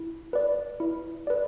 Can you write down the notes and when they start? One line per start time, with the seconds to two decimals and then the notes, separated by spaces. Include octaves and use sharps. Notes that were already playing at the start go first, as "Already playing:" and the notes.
Already playing: E4
0.33 B4 D5
0.80 E4
1.27 B4 D5